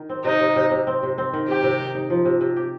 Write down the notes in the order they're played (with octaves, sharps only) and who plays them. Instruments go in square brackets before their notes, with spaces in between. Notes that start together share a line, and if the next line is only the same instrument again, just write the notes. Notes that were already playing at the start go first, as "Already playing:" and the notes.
Already playing: [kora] D#3
C4
[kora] C3 [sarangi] D#4
[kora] C3
C3
C3
C4
C3
C4
D#3
[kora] C3 [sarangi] G4
[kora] C3
D#4
D#4
F3
C3
C3
G4